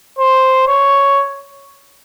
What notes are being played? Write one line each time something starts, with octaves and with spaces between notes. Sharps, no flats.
C5
C#5